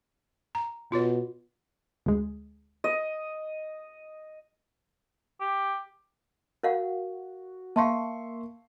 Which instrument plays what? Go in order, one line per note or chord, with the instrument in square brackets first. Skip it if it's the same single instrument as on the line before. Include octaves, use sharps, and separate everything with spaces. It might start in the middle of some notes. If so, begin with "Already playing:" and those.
[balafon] A#5
[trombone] B2 [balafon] F4 F#4 C#5
[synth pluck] D2 G#3
[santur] D#5
[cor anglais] G4
[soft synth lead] F#4 [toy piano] A#4 F5 F#5
[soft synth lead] A#3 [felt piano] E5 C6 C#6 [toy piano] F5 A5